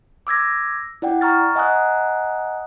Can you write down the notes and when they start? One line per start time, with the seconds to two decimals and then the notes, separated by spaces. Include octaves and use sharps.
0.27 D6 E6 G#6 A#6
1.02 E4 D5 F#5 G5
1.21 A#5 C#6 F6 A6
1.56 D#5 F#5 G#5 A#5 D#6 F#6